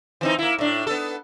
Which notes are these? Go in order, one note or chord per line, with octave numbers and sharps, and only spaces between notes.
E3 C4 D#4
A#3 E4
A2 D4
B3 A4